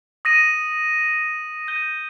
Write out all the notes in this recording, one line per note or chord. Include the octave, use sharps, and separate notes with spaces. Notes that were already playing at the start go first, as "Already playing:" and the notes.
D#6 A#6 D#7
G6 A#6 D#7 G7